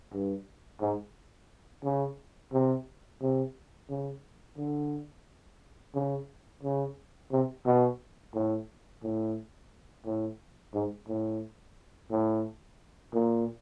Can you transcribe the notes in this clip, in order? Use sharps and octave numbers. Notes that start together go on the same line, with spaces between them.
G2
G#2
C#3
C3
C3
C#3
D3
C#3
C#3
C3
B2
A2
A2
A2
G#2
A2
A2
A#2